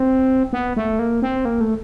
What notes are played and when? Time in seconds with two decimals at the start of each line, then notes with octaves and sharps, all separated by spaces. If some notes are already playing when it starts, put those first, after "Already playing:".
Already playing: C4
0.53 B3
0.76 A3
0.99 A#3
1.22 C4
1.45 A#3
1.61 A3